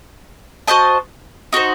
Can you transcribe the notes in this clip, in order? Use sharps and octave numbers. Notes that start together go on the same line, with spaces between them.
F#4 C5 D#5 A5
D#4 F#4 C5